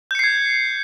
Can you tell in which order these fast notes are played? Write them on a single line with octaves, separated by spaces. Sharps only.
G6 C#7 C7 G#6